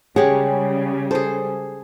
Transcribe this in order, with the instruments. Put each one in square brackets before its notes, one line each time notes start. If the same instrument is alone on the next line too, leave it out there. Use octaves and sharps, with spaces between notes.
[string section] C#3 G3 [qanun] G#3 G4 [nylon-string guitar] G#4 C#5 F#5
[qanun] G#4 C5 [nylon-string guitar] A4